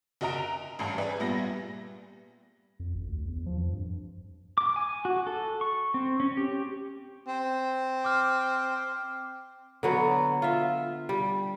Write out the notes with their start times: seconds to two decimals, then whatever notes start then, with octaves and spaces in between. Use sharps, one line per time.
0.21 F#1 F#4 D#5 E5 A#5 D7
0.38 F7
0.79 A1 G2 G#5
0.98 G#4 B4 D5 E5 G5 G#5
1.20 A#2 G3 B3 E5 A#6
2.80 F2
2.94 G#1
3.08 D2
3.26 E2
3.46 F3
3.58 F2
3.72 G2
4.58 D6
4.76 G#5
5.05 F#4
5.27 A4
5.61 C#6
5.94 C4
6.20 C#4
6.37 G4
7.28 C4
8.05 D6 F6
9.83 D3 F#3 B3
10.42 F4 E5
11.09 G3